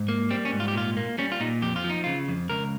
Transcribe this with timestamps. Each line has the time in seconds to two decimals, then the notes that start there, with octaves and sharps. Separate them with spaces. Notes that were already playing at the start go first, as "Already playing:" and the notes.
Already playing: G#2
0.08 A#3
0.31 G3 C4
0.45 C#4
0.52 G#2
0.60 F4
0.68 G4
0.74 A#2 F4
0.97 A#3
1.18 G3 C#4
1.32 F4
1.40 A#2 D#4
1.62 F2 G4
1.76 F4
1.84 F3
1.90 D#4
2.04 C#3 F4
2.28 F2
2.50 C#2 A#4